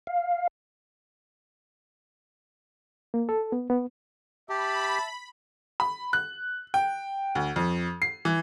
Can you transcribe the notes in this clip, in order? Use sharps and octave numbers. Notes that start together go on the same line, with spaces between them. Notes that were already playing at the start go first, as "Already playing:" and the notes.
F5
A#3
A4
B3
B3
G4 E5 A5 B5
B5
F#6
G5
D2
F2
C7
E3